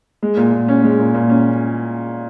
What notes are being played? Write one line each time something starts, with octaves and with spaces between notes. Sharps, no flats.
G#3
A#2
A#2
C#4
G#3
A#2
A#2
C#4